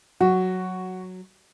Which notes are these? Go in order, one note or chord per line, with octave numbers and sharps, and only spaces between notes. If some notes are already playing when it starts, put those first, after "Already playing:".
F#3 F#4